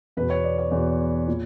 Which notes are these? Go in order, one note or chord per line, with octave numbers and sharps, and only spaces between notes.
E2 B2 B4
C#5
D5
C#5
E2 B2
A#2